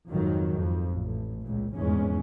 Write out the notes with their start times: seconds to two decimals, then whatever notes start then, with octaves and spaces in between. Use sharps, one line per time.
0.12 G#1 F2 D#3 F#3
0.58 F2
0.92 A1
1.42 C#2 A#2
1.75 F1 A#1 E2 G#2 G#3 C#4